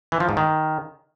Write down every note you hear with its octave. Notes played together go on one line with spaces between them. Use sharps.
E3
F3
G#2
D#3